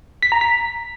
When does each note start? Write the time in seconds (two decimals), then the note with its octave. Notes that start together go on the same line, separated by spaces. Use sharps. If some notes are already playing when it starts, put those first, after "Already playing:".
0.23 B6
0.32 A#5
0.41 B6